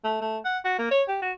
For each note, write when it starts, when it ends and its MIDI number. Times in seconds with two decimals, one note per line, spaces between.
0.04 0.20 57
0.21 0.38 57
0.45 0.58 78
0.64 0.76 66
0.79 0.87 58
0.91 1.03 73
1.08 1.19 67
1.22 1.32 66